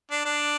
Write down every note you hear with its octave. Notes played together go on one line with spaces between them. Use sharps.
D4
D4